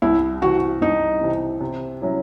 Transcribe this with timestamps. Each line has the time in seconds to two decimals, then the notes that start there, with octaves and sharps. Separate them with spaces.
0.02 C2 E4
0.42 C3 E3 F#4
0.81 C2 D#4
1.21 C3 E3
1.60 C3
2.01 F#3 C#4 E4